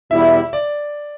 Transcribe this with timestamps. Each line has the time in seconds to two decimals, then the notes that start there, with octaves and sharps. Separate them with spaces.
0.10 E2 B2 G3 B3 E4 E5
0.53 D5